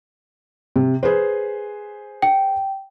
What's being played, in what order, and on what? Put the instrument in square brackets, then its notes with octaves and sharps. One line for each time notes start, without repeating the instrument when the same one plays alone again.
[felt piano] C3
G#4 B4 C5
[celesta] G5